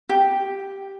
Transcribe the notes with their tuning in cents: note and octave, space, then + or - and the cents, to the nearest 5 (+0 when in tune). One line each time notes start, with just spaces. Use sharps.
G4 +0